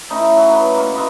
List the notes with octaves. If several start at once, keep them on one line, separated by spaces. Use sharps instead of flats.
A3 C#4 D#4 E4
F#3
B4
A#3 C#6
B4 D#5 E5 C6